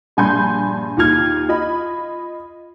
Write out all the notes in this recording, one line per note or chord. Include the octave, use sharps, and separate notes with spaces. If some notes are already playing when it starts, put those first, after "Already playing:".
A#1 G2 G#5 B5 C6 G6
D#2 D#4 F4 F6 G#6
F4 D#5 B5